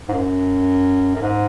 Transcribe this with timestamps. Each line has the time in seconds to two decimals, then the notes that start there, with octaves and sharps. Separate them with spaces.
0.09 G#2
0.13 F#2
1.16 F#2
1.21 G#2